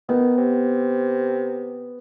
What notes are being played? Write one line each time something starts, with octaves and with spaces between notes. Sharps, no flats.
D#3 B3
C3